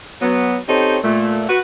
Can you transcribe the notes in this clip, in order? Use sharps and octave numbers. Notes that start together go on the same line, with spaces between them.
F#3 B3
C4 C#4 D#4 G4 A4
A#2 A3
F#4 B4